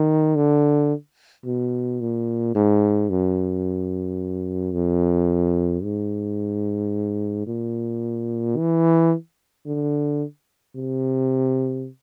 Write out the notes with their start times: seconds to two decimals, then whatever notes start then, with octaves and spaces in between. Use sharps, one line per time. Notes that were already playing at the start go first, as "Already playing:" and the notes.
Already playing: D#3
0.36 D3
1.46 B2
2.01 A#2
2.55 G#2
3.10 F#2
4.74 F2
5.83 G#2
7.47 A#2
8.57 E3
9.66 D3
10.76 C3